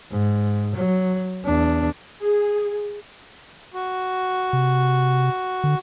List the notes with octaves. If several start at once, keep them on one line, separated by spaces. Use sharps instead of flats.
G#2
F#3
E2 D4
G#4
F#4
C3
D3